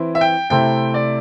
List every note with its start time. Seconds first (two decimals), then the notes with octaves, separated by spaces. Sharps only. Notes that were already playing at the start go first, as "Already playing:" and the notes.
Already playing: E3 C4 E4
0.15 E5
0.21 G5
0.50 C3 A3 C4 E4 G5
0.94 D5